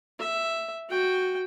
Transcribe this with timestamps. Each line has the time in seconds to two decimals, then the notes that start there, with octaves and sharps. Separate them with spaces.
0.19 E5
0.90 F#4 G5